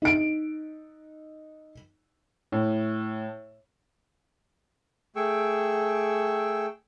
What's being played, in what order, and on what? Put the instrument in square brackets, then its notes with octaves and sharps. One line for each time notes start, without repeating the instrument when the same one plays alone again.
[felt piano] D#4 D7
[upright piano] A2
[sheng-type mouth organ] A3 G#4 G5 C#6 E6